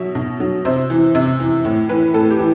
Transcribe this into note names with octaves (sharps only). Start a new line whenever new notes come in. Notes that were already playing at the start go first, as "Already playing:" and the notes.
Already playing: B2 F#3 E5
B2
F#3
C3 C5
E3
C3
E3
A2
E3 B4
A2 A4
G4
E3